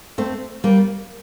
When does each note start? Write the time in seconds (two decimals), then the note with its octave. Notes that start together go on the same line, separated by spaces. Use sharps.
0.18 A3 C4
0.64 G3 A#3